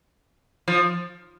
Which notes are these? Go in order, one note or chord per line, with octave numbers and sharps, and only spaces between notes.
F3